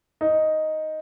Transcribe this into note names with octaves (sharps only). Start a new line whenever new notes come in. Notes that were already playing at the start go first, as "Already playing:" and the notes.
D#4